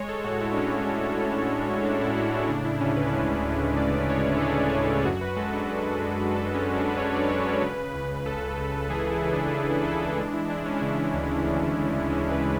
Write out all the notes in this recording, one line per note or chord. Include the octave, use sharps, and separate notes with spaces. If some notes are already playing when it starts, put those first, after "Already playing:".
Already playing: G#3 C#5
A4
A2 F#4
E4
D4
A2 C#4
G#3
A2
G#3
A2 D4
E4
A2 F#4
D4
C#3 D4
E4
D2 C#4
B4
G#3
D2
G#3 D5
G#3 C#5
A4
G#3 G#4
G#3
F#2 F#4
B4
G#3 A4
D4
F#2 F#4
G#3
F#2 A4
C#4
F#2
D4
B4
F#2 C#5
D5
F#2 C#5
B4
C#3 B4
C#2
C#2 A4
C#3
E3 G#4
E4
C#3
D4
E3
E4
E3 A4
D4
G#3 D4
E4
G#3 D4
C#4
E4
C#3 D4
D2
D2
C#3
G#3 C#4
B4